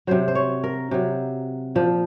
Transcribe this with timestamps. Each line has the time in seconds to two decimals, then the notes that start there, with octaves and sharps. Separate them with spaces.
0.07 C3 F#3 C5
0.28 C5
0.35 C#5
0.64 A#4
0.91 C3 F#3
1.75 A#2 F3